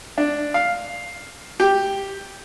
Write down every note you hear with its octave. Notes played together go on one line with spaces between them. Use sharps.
D4
F5
G4